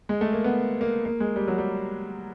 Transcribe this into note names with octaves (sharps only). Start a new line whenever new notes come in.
G#3
A3
A#3
B3
A#3
A#3
G#3
G3
F#3
G3